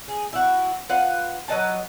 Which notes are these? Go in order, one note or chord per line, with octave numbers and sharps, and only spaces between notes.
G#4
E4 F#4
F4 B4 F5 F#5
F#3 B4 D#5 A5